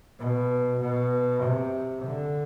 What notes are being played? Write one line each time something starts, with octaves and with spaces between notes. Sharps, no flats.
B2
B2
C3
D3